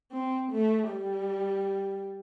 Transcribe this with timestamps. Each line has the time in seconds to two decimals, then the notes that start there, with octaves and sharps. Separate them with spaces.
0.12 C4
0.51 A3
0.91 G3